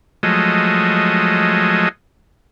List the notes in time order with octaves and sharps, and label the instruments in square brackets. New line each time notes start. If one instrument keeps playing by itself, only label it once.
[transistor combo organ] F3 F#3 G#3 A3 D#5